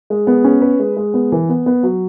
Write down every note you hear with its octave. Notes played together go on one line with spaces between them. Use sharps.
G#3
B3
C#4
B4
G#3
G#3
B3
E3
B3
B3
F#3